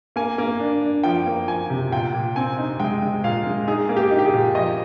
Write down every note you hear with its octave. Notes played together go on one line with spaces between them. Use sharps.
A#3 G#5
A#3
D4
D4
F3 G5
A#3
F3 G#5
C3
A#2 G5
A#2
C4 G#5
D#4
G#3 G5
G#3
A#2 F5
G#3
D#4 G#4
A#3
G4
D#4
G4
G#4
A#2
F3 D#5